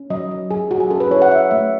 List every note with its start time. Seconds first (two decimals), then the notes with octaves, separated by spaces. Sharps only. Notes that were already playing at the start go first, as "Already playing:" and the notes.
Already playing: C#4
0.10 F#3 D#5
0.31 F#3
0.50 F#3 G#4
0.71 F#3 F#4
0.80 G#4
0.90 C#4 A4
1.00 B4
1.11 E4 C#5
1.22 F#5
1.31 F#3 E5
1.51 A3 E5